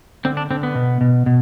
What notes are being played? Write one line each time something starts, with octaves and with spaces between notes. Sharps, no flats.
D3 C4
D4
D3 C4
B3
B2
B2
B2